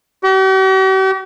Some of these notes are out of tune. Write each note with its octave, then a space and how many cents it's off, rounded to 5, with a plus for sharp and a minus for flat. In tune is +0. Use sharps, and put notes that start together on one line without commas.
G4 -45